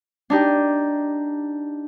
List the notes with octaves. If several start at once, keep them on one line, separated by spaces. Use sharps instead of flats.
D4 D#4 G4